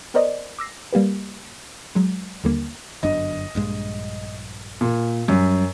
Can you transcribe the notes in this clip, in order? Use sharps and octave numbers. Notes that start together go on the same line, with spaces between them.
B3 A#4 C5 D5 D#5
D6 E6 A#6 C7
G3 A#3 G4 B4
F#3 G#3
D#2 D3 G3 A#3
G1 F#2 D4 D#5
A#1 G2 G#3
A#2
F#2 F#3 G3